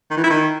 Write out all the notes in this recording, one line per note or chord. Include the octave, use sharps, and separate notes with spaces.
D#3
E3
E4
D#3